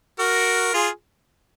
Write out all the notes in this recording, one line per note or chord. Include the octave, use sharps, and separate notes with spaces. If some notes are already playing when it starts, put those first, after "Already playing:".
F#4 A#4
F4 G#4